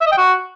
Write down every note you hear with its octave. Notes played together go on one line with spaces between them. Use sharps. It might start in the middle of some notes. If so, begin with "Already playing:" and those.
E5
D#5
G5
F#4